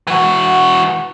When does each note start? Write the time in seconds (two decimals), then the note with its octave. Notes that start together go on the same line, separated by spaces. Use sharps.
0.07 E3 F#4